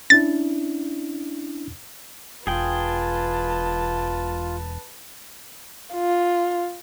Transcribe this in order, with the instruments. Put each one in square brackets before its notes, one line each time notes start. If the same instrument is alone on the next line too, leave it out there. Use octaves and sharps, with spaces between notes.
[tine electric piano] C#4 D4 E4 [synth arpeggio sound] A6
[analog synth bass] E1 [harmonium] F4 [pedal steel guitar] G#4 G5 [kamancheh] B4 A5
[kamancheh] F4